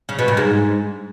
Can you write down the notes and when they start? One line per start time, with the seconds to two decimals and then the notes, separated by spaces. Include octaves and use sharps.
0.09 C#3
0.19 B2
0.28 A#2
0.37 G#2